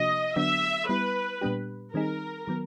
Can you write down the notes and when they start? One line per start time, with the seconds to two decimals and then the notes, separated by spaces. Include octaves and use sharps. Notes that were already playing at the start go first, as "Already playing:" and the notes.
Already playing: C3 F3 A#3 D4 F#4 D#5
0.36 D3 F#3 B3 D4 F#4 E5
0.88 G3 B3 E4 B4
1.41 A#2 G3 B3 D4 G4
1.94 D#3 G3 C4 D#4 G#4 A#4
2.47 D#3 F#3 B3